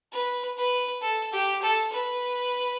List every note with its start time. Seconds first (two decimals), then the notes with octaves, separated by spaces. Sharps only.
0.12 B4
0.57 B4
1.02 A4
1.33 G4
1.62 A4
1.92 B4